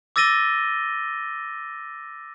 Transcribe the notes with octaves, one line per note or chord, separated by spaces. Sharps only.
D6 E6 A6 A#6 D#7 G7